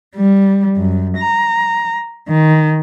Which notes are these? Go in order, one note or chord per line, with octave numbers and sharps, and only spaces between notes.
G3
F#2
A#5
D#3